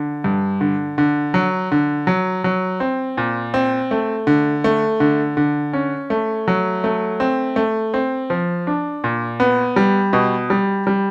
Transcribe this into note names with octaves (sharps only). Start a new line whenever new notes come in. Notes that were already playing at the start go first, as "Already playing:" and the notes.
Already playing: D3
G2
D3
D3
F#3
D3
F#3
F#3
C4
A#2
C4
A3
D3
A3
D3
D3
C#4
A3
F#3
A3
C4
A3
C4
F3
D4
A#2
B3
G3
B2
G3
G3